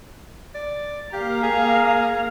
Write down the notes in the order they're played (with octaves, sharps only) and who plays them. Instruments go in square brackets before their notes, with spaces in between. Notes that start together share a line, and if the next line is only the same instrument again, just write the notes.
[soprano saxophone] D5
[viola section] A#3 F5 A#5 [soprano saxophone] G4
[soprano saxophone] G#4